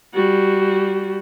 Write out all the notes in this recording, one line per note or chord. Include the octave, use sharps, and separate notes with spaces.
G3 F#4